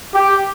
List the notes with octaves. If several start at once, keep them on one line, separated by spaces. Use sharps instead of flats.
G4